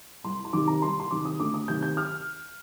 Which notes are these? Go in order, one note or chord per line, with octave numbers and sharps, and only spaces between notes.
C2 C6
C6
C3 D#3 D6
A#5
C2 C6
C6
C3 D#3 D6
D#6
D2 D6
D#6
C3 D#3 G6
G6
F6